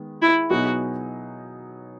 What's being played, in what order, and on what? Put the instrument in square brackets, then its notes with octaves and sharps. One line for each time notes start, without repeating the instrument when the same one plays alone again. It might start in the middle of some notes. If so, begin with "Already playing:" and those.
Already playing: [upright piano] D#3 G#3 B3
[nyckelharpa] E4
[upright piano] B2 F#3 B3 D#4 G#4 [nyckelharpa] F#4